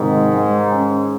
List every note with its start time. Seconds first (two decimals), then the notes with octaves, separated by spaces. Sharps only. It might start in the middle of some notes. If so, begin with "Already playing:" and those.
Already playing: G#2 C3 D#3
0.32 G#3
0.72 C#4